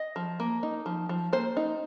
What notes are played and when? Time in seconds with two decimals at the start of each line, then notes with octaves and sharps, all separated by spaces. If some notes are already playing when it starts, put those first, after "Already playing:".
Already playing: D#5
0.16 F3
0.40 A#3
0.63 D#4
0.86 F3
1.09 F3
1.33 A#3 C5
1.57 D#4